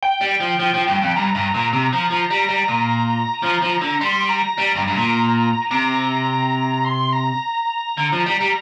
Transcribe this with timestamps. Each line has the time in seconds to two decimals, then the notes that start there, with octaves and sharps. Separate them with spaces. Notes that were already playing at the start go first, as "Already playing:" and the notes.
0.03 G5
0.21 G3
0.40 F3
0.59 F3
0.74 F3
0.88 G2
1.02 F2
1.16 G2 A#5
1.35 G2
1.54 A#2
1.73 C3
1.93 F3
2.11 F3
2.30 G3 A#5
2.49 G3
2.68 A#2
3.43 F3
3.62 F3
3.82 D3
4.01 G3 C6
4.29 A#5
4.58 G3
4.76 G2
4.88 G2
4.96 A#2
5.71 C3 A#5
6.85 C6
7.13 A#5
7.98 D3
8.12 F3
8.26 G3
8.40 G3